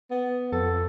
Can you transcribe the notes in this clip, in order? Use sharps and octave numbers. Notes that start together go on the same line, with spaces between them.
B3
F2 A4